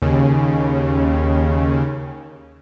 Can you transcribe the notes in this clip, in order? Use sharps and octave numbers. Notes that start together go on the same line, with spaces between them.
D#2 C#3